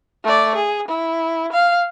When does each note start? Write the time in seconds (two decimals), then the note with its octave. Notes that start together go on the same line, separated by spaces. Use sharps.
0.24 A3 D5
0.55 G#4
0.88 E4
1.52 F5